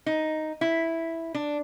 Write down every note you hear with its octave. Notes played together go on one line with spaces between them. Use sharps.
D#4
E4
D4